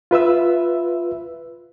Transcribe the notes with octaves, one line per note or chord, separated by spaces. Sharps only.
F4 B4 E5 E6